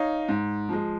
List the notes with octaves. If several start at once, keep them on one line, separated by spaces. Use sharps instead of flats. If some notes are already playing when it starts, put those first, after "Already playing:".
Already playing: D#4 C#5 F5
G#2
F3 G#3